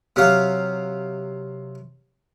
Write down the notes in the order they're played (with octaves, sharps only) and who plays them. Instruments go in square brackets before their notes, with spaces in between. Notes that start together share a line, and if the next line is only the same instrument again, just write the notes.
[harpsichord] C3 F#3 F5